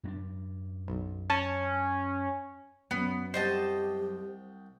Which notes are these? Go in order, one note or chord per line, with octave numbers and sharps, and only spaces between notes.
F#2 C4 D4
B1
C#4 A5
F#2 F#3 B3
C2 G4 C5 D#5 F#5 G5 A5